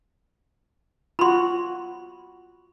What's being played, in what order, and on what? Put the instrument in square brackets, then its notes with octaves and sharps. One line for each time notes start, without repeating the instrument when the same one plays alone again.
[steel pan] F4 F#4 [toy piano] B5 C6